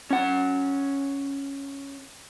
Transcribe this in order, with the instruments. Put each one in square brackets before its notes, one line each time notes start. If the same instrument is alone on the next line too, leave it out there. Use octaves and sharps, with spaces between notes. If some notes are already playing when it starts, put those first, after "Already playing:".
[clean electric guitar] C#4 F#5